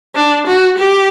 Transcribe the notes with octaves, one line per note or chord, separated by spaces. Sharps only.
D4
F#4
G4